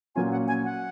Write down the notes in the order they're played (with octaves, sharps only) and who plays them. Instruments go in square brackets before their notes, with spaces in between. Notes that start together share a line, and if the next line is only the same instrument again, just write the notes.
[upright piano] A#2 F#3 C#4 F4 [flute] G#5
[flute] F#5
G#5
F#5